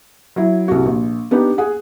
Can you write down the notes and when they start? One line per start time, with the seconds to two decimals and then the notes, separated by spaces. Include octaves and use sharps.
0.36 F#3 E4
0.68 C2 F#4
0.85 A#1
1.31 B3 D4 D#4 G4
1.58 G#4 F#5